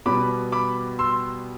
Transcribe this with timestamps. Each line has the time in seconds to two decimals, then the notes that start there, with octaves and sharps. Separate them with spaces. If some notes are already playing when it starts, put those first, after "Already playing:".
0.06 B2 G3 B3 B5 D6
0.52 B5 D6
0.99 C6 E6